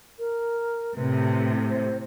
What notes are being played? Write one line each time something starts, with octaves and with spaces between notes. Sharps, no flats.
A#4
A2 C3 B4
C5